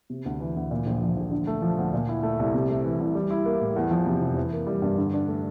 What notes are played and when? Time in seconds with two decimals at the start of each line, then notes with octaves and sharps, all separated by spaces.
0.10 C3
0.26 D2
0.40 E3
0.57 D2
0.71 A#2
0.86 A#1
1.02 F3
1.16 A#1
1.32 D3
1.47 A3
1.62 F3
1.78 D2
1.93 A#2
2.09 E4
2.23 A3
2.39 C2
2.54 C3
2.69 A3
2.84 E3
3.00 C2
3.15 G3
3.31 E4
3.45 A#3
3.61 A2
3.76 E2
3.91 F3
4.06 C3
4.21 F1
4.37 E3
4.53 A#3
4.67 G3
4.82 G2
4.98 D3
5.14 D4
5.28 A3